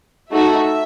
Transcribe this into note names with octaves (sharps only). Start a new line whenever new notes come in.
A3 D#4 F#4 A4 E5